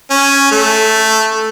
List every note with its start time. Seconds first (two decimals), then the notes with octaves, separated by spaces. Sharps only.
0.11 C#4
0.52 A3